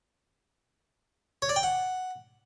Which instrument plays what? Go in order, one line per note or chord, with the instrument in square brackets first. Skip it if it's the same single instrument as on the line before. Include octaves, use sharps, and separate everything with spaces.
[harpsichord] C#5
D5
G5
F#5